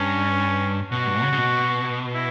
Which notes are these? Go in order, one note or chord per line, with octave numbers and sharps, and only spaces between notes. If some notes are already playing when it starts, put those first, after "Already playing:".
Already playing: G2 C#4
B2 F#4
G2
C#3
C#3
B2
E4